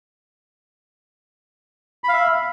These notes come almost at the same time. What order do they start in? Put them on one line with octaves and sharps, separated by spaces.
B5 F5 E5